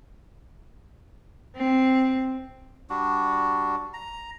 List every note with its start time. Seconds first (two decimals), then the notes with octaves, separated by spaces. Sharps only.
1.56 C4
2.90 G3 D4 F#4
3.93 A#5